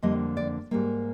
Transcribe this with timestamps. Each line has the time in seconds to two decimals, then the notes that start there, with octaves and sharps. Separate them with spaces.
0.02 F2 D3 G3 A#3 D#5
0.37 D5
0.71 G#2 G3 A#3